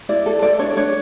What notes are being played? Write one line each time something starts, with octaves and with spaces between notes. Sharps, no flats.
E4 D5
A4
A4 D5
D4 C#5
D5
D4 C#5